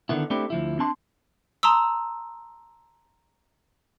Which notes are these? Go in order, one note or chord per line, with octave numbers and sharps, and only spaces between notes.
D3 D#3 B3 E4
A3 C4 D4 E4 G4
D2 F3 E4
C4 D4 A5 C6
A5 A#5 C6 D#6 E6